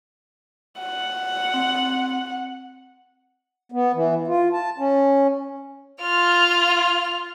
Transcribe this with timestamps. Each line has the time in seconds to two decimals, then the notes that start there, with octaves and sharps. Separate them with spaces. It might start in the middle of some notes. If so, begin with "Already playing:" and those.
0.79 F#5
1.54 C4
3.72 B3
3.94 E3
4.27 F4
4.53 A5
4.78 C#4
6.03 F4 F6